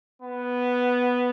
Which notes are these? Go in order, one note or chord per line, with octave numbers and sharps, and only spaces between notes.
B3